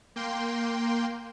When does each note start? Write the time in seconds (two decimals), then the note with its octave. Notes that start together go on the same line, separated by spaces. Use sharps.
0.16 A#3 G5 C6